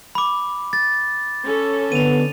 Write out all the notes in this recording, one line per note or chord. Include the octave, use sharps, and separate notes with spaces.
B5 D6
A6
C#4 A4
D3 B3 D#7 F7